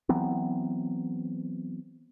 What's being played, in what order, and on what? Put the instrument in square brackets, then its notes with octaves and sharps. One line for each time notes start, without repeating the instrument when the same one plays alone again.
[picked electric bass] E3 F#3 B3 C4